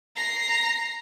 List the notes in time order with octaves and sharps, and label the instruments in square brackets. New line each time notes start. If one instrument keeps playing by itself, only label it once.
[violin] A#5 C7